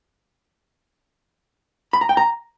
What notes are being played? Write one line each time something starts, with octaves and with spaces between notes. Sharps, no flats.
B5
A#5
G5
A#5